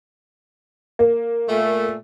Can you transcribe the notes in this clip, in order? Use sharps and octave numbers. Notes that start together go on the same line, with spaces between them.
A#3
A#2 A3